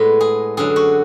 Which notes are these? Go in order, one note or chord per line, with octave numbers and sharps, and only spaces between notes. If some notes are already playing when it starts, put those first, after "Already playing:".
Already playing: A2 G#3 B3 B4
G#4
F#2 D3 F#3 G#4
F#4